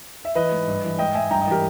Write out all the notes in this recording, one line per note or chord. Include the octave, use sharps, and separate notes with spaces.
E5
E3 B4 D#5
G#2
G2
E3
G#2 D#5 G5
G#2 E5 G#5
G2 G5 A#5
D#5 G5
E3 G4 A#4